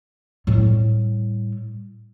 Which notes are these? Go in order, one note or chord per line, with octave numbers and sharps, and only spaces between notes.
A2 G3